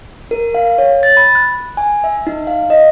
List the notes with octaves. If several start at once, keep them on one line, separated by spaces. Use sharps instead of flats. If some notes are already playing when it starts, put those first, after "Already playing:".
A#4
F5
C#5
A6
B5
F#6
G#5
E5
D#4
F5
D#5